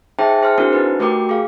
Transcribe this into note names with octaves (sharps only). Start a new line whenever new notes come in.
D#4 G#4 C5 E5 G5 A5
G#4 C5 C6 F6
C4 D4 E4 F#4 A#4 C5
D#4 B4
A3 F#4 G4 A#4 G5 D6
G#4 F5